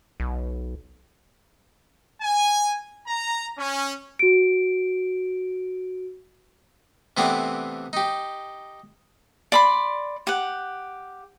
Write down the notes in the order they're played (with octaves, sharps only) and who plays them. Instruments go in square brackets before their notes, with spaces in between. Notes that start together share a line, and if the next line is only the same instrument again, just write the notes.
[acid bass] B1
[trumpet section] G#5
A#5
C#4
[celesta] F#4 D7
[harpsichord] C3 E3 A3 B3 C4 D4
D#4 G4
[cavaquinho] D5 B5 C6
G4 F#5